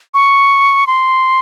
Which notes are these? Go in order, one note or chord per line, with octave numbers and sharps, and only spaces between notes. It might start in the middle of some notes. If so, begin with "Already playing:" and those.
C#6
C6